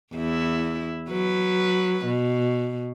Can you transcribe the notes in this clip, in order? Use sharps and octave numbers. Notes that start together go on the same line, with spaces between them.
E2 E4
F#3 B4
B2